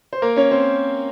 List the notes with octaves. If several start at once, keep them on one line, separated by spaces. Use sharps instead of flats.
C5
A#3 A#4
C#4 C#5
C4 C5